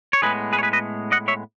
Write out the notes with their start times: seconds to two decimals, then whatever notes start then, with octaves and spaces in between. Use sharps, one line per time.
0.13 C#5
0.22 A2 G#3 B3 G#4 B4
0.53 G#4 B4
0.59 C#5
0.63 G#4 B4
0.73 B4 D#5
1.12 D#5 F#5
1.28 C#5 E5